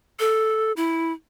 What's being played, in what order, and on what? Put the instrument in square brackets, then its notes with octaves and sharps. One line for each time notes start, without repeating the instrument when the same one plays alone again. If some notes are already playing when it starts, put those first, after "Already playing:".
[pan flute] A4
E4